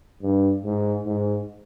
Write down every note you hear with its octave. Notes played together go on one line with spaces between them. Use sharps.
G2
G#2
G#2